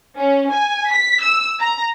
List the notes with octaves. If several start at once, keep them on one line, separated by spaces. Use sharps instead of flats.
C#4
G#5
B6
E6
A#5